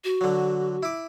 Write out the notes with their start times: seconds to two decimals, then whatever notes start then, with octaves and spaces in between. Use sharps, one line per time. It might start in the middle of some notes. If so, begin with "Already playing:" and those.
0.04 F#4
0.21 D3 F#3
0.83 E4 D6